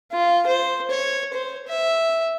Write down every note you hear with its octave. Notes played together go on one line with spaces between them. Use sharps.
F4
C5
C#5
C5
E5